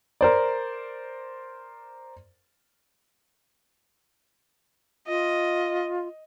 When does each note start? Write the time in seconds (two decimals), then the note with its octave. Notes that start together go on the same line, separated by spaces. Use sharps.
0.21 A#4 C5 D5
5.08 F4 D#5